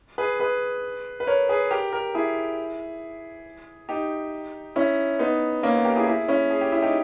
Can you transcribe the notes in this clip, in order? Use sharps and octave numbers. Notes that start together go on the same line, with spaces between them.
G#4 B4
G#4 B4
B4
A#4 C#5
G#4 B4
G4 A#4
G4 A#4
E4 G#4
D#4 G4
C#4 E4
B3 D#4
A#3 C#4
B3
G4 A#4
E4 G#4
E4 G#4
C#4 E4
G#4
G4
E4
D#4 G4